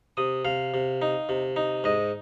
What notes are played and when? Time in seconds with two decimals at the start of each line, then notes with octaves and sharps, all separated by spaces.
0.17 C3 D#6
0.45 C3 F5
0.74 C3
1.02 D#4
1.29 C3
1.56 D#4
1.84 G#2 D#5